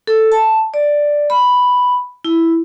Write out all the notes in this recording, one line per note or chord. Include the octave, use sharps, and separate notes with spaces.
A4
A5
D5
B5
E4